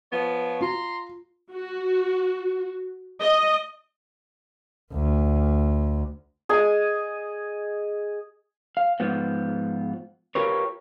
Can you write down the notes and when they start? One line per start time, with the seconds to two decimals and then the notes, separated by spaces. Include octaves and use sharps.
0.10 F3 B3 C#5
0.61 F4 A#5 C6
1.51 F#4
3.21 D#5
4.94 D2
6.49 G#4 D#5
8.77 F5
9.00 G#2 F3 B3
10.35 F4 G4 A#4 B4 C#5